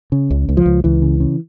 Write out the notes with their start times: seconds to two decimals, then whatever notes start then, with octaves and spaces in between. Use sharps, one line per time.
0.12 C#3
0.30 C#2
0.49 C#2
0.57 F3
0.66 C#2
0.84 C#2 E3
1.02 C#3
1.20 C#3